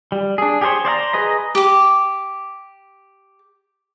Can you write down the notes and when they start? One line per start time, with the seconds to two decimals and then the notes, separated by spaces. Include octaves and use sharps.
0.12 G3
0.38 D4 G#4
0.61 G4 G#4 A#4 C5 C#5
0.85 C5 D5 F5 A#5
1.13 G#4 B4 D#5 A#5
1.55 G4 D6